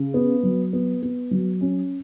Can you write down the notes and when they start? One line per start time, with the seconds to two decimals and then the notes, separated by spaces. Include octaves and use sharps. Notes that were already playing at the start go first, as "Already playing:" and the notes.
Already playing: C#3
0.14 B3
0.43 F#3
0.73 B3
1.02 B3
1.31 F#3
1.61 C#4